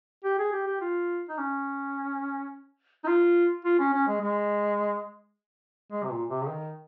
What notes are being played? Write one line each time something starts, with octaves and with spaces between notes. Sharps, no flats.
G4
G#4
G4
G4
F4
D#4
C#4
D#4
F4
F4
C#4
C#4
G#3
G#3
G#3
C3
A#2
C3
C#3
D#3